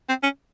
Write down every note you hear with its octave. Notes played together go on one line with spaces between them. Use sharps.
C4
C#4